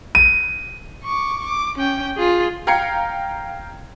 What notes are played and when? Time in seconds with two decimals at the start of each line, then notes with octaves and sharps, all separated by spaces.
0.15 D#7
1.04 C#6 D6
1.47 D6
1.78 C#4 G5
2.17 F4 G#4
2.67 F5 G5 A#5 G#6 C7 C#7